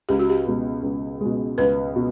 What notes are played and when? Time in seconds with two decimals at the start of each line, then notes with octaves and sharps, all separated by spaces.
0.09 C#2 G4
0.19 F#4
0.30 G4
0.47 B2 G#3
0.83 C#2
1.21 B2 G#3
1.58 C#2 B4
1.96 B2